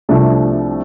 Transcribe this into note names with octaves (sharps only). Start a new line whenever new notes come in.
C2 C3 F3 A3 D4